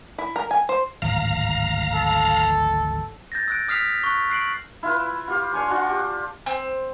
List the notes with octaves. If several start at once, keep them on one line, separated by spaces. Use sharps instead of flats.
E4
A#4
G#5
C5
D1 G#1 A2 F5 A#5
A4
G6 A6 A#6
E6 F#6 D7
D#6 F6 B6 C7 F7
C#6 F#6
F#6 C7 D7 F#7
E4 F4 B4
F4 G4 F5
D4 C#5 G#5 C6
D4 F4 F#4
G4
C4